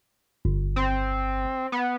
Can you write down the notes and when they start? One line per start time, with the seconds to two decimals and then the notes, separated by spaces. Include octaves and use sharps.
0.45 G1
0.76 C4
1.72 B3